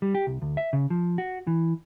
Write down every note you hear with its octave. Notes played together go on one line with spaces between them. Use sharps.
G3
G4
C2
D2
E5
C#3
F3
F#4
E3